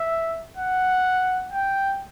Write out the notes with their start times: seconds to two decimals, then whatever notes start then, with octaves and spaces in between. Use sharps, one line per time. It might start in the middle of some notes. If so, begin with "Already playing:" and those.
Already playing: E5
0.57 F#5
1.51 G5